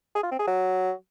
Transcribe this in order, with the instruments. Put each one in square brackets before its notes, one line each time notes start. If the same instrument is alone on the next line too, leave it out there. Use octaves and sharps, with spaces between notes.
[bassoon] G#4
F4
C4
G#4
F#3